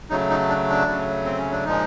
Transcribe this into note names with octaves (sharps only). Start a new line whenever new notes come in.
C#3 F#3 A3 D#4
D#4
D4
D4
C#3 F#3 A3
C4
C#4
D4
A#2 F3 G#3 D#4